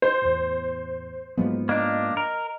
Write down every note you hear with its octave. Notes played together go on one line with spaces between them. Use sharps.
C5
E2 A2
G#2 F3 F#3 G#3 A#3 B3
A#3 D4 D#5
A#4